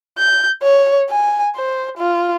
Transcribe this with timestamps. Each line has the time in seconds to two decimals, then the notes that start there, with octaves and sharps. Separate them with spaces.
0.18 G6
0.62 C#5
1.10 G#5
1.56 C5
1.97 F4